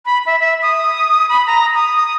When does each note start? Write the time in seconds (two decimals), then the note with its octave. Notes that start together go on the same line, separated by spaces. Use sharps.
0.05 B5
0.26 E5
0.40 E5
0.62 D#6
1.29 B5
1.47 A#5
1.75 D#6
1.96 D#6